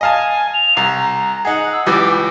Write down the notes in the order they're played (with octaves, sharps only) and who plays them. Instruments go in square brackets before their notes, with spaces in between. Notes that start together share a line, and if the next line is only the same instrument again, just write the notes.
[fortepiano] D#5 F5 A5 [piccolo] G#5
[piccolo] F7
[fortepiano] C2 [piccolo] A#5
[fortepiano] D#4 G#4 [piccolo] F#5
[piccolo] E6
[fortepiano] C#2 E3 G3 [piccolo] D6